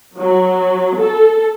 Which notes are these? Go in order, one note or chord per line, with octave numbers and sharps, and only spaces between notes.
F#3
A4